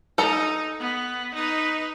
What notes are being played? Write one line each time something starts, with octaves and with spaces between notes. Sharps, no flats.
D#4 A4 A#5
B3
D#4 B4